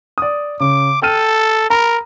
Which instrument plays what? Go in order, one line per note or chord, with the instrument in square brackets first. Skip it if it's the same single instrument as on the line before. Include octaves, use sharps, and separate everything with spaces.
[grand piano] D5 D#6
[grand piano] C#3 [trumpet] D6
[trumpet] A4 [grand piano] G5 F6 D#7
[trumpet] A#4 [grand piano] A#5 B5